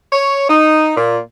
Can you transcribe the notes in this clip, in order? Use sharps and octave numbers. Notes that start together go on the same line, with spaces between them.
C#5
D#4
A#2